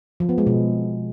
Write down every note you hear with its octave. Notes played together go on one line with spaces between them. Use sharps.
F3
B3
G#3
B2